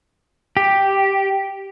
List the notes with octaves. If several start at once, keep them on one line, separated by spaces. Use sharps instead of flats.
G4